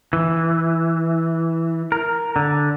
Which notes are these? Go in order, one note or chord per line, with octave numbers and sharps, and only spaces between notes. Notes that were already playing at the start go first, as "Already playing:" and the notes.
E3
A#4
D3